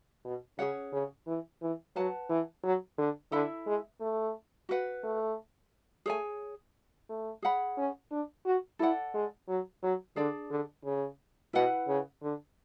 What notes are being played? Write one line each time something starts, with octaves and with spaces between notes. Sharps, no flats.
B2
C#3 C#4 G#4 C#5 F#5
C#3
E3
E3
F#3 B4 F#5 A5
E3
F#3
D3
D3 E4 A4 E5 B5
G#3
A3
F#4 B4 F#5
A3
A3 G#4 C#5 G#5
A3
G#4 C#5 F#5 B5
C#4
D4
F#4
E4 A4 D5 F#5
G#3
F#3
F#3
D3 D4 G#4 D5 A5
D3
C#3
B2 E4 B4 F#5
C#3
D3